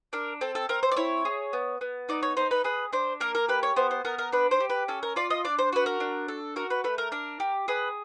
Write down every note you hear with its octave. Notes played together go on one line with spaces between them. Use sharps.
D4 A#4
C4 A4
A4
C4 A#4
C5
D5
E4 C#5
G#4
B3
B3
D#4 D5
C#5
D#4 C5
B4
G#4 B4
D4 C5
A#3 A#4
A#4
G4 B4
C#5
B3 C5
C5
B3 A#4
A#4
D4 B4
C5
G4
B4
C#4 A4
A#4
F4 D5
D#5
D4 D5
C5
F#4 B4
A#4
D4
A4
F#4 A#4
B4
A3 B4
A#4
D4 A#4
G4
G#4 B4